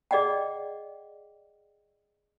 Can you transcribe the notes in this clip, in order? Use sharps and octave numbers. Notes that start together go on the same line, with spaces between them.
G#4 D5 D#5 F#5 G5